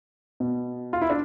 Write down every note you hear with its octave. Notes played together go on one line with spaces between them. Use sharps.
B2
F4
E4
D4